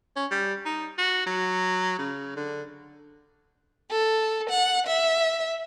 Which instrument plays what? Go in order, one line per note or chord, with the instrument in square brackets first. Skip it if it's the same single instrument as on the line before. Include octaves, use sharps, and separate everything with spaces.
[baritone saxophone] C#4
G3
D#4
F#4
F#3
C#3
D3
[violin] A4
F#5
E5